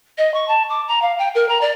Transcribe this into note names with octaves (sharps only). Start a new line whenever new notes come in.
D#5
C#6
A5
D6
A#5
F5
G5
A#4
A#5
D5